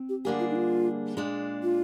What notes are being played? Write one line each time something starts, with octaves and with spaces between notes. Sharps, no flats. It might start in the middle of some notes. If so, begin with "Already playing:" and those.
Already playing: C4
G4
D3 G3 A#3 D4 G4 G#4
F4
D#4
F4
A#2 G#3 D4
F4